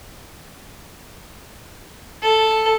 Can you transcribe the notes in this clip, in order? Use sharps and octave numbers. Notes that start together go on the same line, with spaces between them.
A4